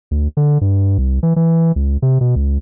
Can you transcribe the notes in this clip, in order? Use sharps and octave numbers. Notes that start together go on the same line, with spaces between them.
D2
D3
G2
C2
E3
E3
C#2
C3
B2
C#2